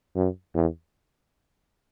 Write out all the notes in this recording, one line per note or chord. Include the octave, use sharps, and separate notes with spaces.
F#2
E2